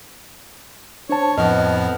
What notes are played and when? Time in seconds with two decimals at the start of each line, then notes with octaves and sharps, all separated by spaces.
1.09 D4 C5 C#5 A5
1.38 F2 A2 F3 B3 D#5 F6